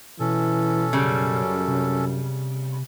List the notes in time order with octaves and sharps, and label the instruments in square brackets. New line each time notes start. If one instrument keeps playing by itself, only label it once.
[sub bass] B2 [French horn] E3 [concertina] C#4 A4
[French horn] F#2 [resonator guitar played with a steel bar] C#3 G3
[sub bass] C3